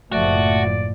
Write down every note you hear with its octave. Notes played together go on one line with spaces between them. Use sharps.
F#1 A2 F3 A3 F#4 D5